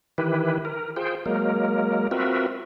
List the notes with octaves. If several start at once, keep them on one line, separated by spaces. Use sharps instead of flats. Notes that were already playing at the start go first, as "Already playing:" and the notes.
D#3 E3 E4 G4 B4
A#4
F4 G#4 C5 G5
F#3 G#3 A#3 A#4
C4 F4 F#4 A#4 B4 E5